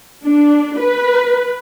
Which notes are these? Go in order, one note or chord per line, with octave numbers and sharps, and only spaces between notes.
D4
B4